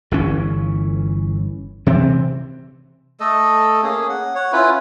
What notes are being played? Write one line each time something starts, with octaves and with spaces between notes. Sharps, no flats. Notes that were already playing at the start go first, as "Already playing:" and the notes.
G1 E3 C#4
C3 E3 C4
A3 A4 D#5
A#3 C#4 G#4
F#5
C#5 F#5
C#4 E4 F4 B4